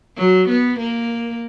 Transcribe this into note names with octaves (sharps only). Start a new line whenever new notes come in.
F#3
B3
A#3